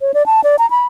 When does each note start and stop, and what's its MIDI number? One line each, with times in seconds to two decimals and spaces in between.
0.01 0.12 73
0.14 0.26 74
0.26 0.41 81
0.44 0.56 74
0.59 0.69 82
0.70 0.87 83